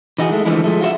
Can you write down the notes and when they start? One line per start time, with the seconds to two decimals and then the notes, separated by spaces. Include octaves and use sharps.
0.18 E3 D#4 F#4 G#4
0.31 G#3 A3
0.45 D3 E3 F3 G#3 A3 E4
0.64 F3 G#3 A3
0.81 F4 F#4 C5 E5